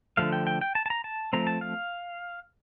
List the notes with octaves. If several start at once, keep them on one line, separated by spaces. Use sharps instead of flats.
D3 F3 A3 F5
G5
G5
G5
A5
A5
A#5
A5
F3 A3 C4 A#5
A5
F5